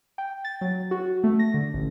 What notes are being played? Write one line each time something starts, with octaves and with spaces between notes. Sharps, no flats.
G5
A6
F#3
F#4
A3
A#6
D3
A1